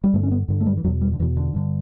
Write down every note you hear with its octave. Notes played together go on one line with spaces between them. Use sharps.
G3
G2 D3 A3
C#4
B3
G2 D3
A3
G3
E3
E2 B2 F#3
G3
D3
E2 B2 E3
D3
G2 D3